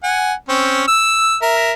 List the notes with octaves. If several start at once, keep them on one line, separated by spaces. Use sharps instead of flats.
F#5 G#5
C4 C#4
E6
A#4 E5